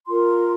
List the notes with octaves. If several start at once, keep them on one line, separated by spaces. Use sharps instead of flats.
F4 A#4 C6